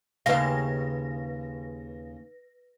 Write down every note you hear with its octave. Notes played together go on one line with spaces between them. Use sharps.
D#2 C#3 B4 F5 A#6